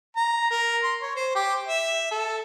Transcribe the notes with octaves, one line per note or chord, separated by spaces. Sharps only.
A#5
A#4
C6
C#5
C5
G4
E5
A4